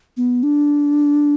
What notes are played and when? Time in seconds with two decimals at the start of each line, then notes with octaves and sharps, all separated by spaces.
0.17 B3
0.43 D4